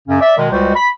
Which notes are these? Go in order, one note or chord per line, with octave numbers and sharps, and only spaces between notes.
F#2 C#3 C#4
D5 E5
B2 D#3 G#3
C#2 G3 G#3 F#4 C5
B5